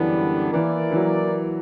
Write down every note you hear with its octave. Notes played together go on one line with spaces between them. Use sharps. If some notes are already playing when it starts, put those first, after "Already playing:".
Already playing: F#2 D3 E3 G3 B3 D4
E3 A#3 E4 A#4 D5
E3
F#3